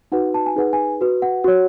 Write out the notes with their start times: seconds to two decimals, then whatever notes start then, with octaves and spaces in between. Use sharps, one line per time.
0.12 D#4 F#4 B4 F#5
0.34 A5
0.46 G#5
0.56 D#4 G#4 B4 F#5
0.73 G#5
1.01 F#4 B4
1.22 F#5
1.44 F#4 C#5